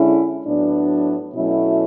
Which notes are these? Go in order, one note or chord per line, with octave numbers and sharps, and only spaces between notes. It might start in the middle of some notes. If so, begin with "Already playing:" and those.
Already playing: D3 G#3 C#4 E4
A2 F#3 B3 D4
B2 F#3 A3 C#4 E4